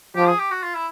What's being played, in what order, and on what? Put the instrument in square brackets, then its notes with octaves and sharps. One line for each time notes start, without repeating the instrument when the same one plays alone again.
[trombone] F3 [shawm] G4
[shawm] G#4
G4
F#4
F4
E4